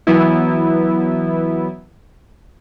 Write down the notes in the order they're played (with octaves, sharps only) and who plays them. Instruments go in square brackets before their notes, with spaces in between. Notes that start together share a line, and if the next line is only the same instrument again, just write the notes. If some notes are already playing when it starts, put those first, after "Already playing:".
[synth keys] E3 F#3 B3 E4